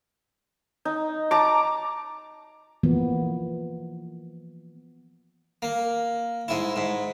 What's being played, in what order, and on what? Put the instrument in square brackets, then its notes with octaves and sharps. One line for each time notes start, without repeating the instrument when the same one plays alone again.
[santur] D#4
A5 A#5 D6
[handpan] E3 F3 A#3 B3
[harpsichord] A#3
G#2 E4
G#2